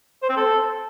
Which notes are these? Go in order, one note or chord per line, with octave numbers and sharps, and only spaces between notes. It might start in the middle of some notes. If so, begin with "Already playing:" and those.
C5
C4
A4